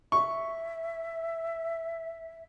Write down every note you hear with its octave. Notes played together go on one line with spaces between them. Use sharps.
E5 C#6